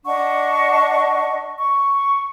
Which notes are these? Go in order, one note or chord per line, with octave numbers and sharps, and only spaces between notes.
D4 D#5 F#5 C#6
C#6